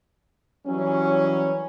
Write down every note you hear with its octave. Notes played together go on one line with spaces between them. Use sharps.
E3 F#3 G3 C#4